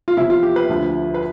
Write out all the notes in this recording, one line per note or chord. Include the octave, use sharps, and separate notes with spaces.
F4
E2 C3 F3 E4
F4
G4
B4
D2 D3 F3
B4